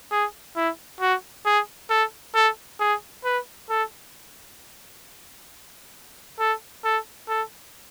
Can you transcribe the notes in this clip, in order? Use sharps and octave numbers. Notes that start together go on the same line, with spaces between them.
G#4
E4
F#4
G#4
A4
A4
G#4
B4
A4
A4
A4
A4